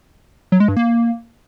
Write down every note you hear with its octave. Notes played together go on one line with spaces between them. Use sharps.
F#3
G#3
G2
A#3